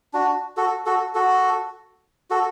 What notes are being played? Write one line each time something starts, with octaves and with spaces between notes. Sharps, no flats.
D4 F#4
F#4 A4
F#4 A4
F#4 A4
F#4 A4